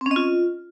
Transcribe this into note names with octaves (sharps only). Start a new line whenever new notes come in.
C4
C#4
D#5
F4